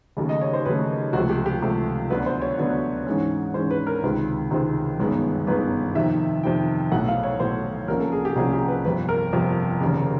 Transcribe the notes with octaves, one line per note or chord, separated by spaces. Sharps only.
D#2 C#3 F#3 A3
D#5
C#5
C5
D#2 C#3 F#3 A3 B4
C#2 C3 F3 A3 F#4
G4
G4
C#2 C3 F3 A3
D2 D3 F#3 B3 B4
C5
C#5
D2 D3 F#3 B3
G#2 E3 G#3 C#4
G#2 E3 G#3 C#4 C5
B4
A#4
C#2 C3 D#3 G#3 C4 B4
C#2 C3 D#3 G#3 C4
G1 F#2 D#3 G#3 B3
G1 F#2 D#3 G#3 B3 B4
F2 C3 D#3 E5
F2 C3 D#3 G5
B1 A2 F#3 A3 F#5
F5
C#5
B1 A2 F#3 A3 C5
C2 C3 F3 A#3 C#4 A#4
A4
G#4
G4
C2 C3 F3 A#3 C#4 G#4
G4
B4
G1 F2 C3 B4
A#4
G1 F2 C3
F1 D#2 C#3